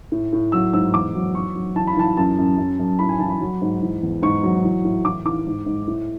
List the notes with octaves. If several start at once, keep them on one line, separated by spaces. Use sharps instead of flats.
A2
A2
F#3 E6
G#2 E6
E2 D6
F#3
F#3 C#6
F#3
E3 A5
B5
E3 A5
F#2 A5
F#2
F#2
F#2
A2 B5
G#5
E3 A5
B5
F#3
G#2
E3
E2
G#2 C#6
F#3
E3
A2
E3 D6
E3 D6
G#2
G#2
A2